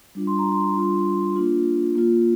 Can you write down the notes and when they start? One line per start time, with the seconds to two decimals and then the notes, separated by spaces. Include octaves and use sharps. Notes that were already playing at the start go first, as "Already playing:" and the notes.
0.15 G3 D4 F4
0.27 C6
0.39 A#5
0.52 C6
0.75 G3 D4 F4
1.36 A#3 D4 F4
1.95 A#3 F4